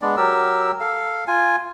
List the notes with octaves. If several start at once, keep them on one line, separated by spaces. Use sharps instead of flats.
G#3 B3 D4 D5
F#3 G4 A#4 E6
A4 F5
F4 G#5